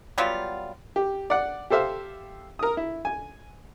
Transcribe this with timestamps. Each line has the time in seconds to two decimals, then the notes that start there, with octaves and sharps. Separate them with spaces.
0.18 F#3 G3 B3 F4
0.96 G4
1.30 D5 F#5
1.70 G4 A4 C5 E5 F5
2.59 A#4 D#6
2.77 E4
3.05 G#5